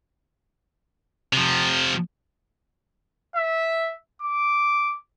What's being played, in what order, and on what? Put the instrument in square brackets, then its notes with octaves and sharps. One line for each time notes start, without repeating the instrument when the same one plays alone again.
[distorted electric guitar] C3 F3
[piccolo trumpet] E5
D6